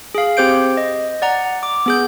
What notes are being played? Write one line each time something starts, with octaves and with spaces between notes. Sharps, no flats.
G#4 F5
C4 G4 C5 G6 D7
D#5
D5 F#5 A#5
D6
B3 G#4 G6